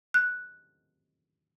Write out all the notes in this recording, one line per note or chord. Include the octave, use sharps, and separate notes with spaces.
F#6